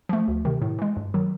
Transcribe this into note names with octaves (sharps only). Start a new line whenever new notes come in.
F3 A3
D2
C3 D#3
A2
E3 G#3
G2
D#3 F#3